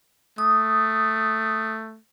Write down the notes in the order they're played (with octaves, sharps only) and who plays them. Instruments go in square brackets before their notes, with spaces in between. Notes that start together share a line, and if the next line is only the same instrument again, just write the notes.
[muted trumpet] A3 [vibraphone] D#6